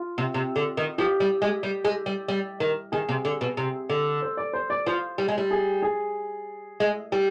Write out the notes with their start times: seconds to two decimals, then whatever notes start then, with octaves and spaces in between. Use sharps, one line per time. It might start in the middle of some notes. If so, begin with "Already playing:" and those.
Already playing: F4
0.18 C3
0.34 C3
0.56 D3
0.77 D#3
0.98 F3 G4
1.20 G3
1.42 G#3
1.63 G3
1.85 G#3
2.06 G3
2.28 G3
2.60 D#3
2.92 D#3 G#4
3.09 C3
3.25 D3
3.41 B2
3.57 C3
3.90 D3
4.22 C5
4.37 D5
4.53 C5
4.70 D5
4.86 F3 C5
5.18 G3
5.28 G#3
5.38 G3
5.51 G#4
5.82 G#4
6.80 G#3
7.12 G3